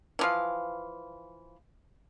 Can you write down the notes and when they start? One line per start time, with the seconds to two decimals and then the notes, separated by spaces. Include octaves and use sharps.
0.19 E3 F3 F5